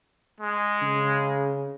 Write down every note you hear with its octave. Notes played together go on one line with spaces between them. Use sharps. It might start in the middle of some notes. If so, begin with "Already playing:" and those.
G#3
C#3